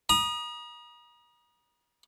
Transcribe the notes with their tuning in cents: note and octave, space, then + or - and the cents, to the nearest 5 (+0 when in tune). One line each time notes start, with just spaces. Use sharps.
A#5 +40 D#6 -15